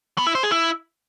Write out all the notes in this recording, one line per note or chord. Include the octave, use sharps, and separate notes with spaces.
B3
E4
C5
G#4
E4